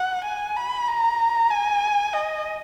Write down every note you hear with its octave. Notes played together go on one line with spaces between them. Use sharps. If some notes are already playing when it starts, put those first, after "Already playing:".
Already playing: F#5
G#5
B5
A#5
G#5
D#5